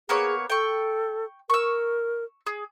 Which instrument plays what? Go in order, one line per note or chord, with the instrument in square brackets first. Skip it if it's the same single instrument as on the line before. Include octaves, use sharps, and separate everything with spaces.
[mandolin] A#3 B3 C#5 [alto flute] G#4
[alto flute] A4 [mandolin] G5 C#6
[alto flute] A#4 [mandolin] C#6 E6
[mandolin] G#4